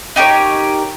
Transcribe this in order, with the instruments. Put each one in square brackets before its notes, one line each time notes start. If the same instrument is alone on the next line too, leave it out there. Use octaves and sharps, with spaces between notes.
[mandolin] D#4 G4 A#4 C#5